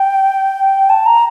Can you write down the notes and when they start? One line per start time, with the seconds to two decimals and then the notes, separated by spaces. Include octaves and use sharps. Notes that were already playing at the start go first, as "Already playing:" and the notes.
Already playing: G5
0.90 A5
1.06 A#5